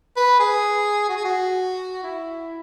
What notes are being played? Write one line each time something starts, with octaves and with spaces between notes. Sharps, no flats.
B4
G#4
F#4
G#4
F#4
E4